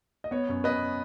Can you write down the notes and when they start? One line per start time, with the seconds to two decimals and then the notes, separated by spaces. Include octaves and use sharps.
0.24 D#5
0.31 B3 C#5
0.49 F#2
0.64 B3 B4 D#5